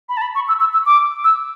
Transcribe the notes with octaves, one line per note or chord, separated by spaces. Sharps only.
B5
A5
B5
C#6
E6
E6
E6
D6
E6